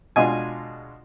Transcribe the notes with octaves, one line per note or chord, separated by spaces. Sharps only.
B2 G#3 D4 F4 G#5